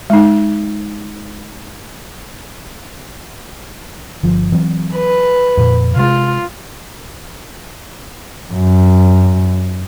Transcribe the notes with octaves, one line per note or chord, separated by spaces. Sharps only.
G#3 D#4
G1 F3
E3 F#3 C4
B4
F2 A#2
C3 G#3 F4
F#2